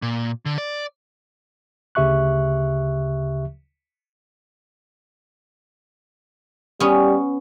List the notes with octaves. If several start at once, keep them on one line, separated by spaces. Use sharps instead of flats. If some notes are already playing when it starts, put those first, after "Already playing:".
A#2
D3
D5
D2 C#3 G4 E5 C#6 F#6
G3 B3 C#4